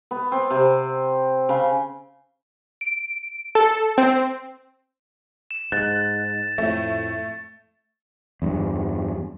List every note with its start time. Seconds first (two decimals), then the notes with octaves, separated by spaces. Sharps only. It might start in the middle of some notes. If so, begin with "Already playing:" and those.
0.11 B3
0.32 C4
0.50 C3
1.49 C#3
2.81 D7
3.55 A4
3.98 C4
5.51 E7
5.72 G#2 F#6 A6
6.58 F2 A2 A3
8.42 E2 G2